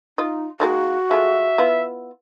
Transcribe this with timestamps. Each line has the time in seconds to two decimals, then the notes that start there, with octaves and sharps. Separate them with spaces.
0.18 D#4 F4 D#5
0.60 D#3 G#3 A#3 F#4
1.11 G#3 A3 F4 E5
1.58 B3 E4 F4